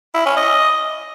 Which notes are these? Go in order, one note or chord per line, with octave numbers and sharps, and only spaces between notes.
E4
C#4
D#5